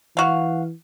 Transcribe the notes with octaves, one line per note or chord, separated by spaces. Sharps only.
E3 F#4 F5